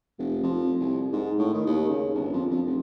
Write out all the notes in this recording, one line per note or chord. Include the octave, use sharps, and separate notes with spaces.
F1
F2
C2
G#2
A2
D#3
D#2
C#3
G1
F2
F2
F1